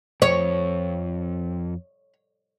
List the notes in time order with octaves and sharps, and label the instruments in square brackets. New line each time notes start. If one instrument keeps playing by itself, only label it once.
[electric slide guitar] F2 [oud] C#5